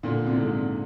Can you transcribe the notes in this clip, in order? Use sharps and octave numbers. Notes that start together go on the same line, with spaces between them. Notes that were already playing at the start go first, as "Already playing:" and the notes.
A#2 D3
C3
D3
G#2 C3